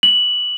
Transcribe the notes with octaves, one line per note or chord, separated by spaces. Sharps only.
F#7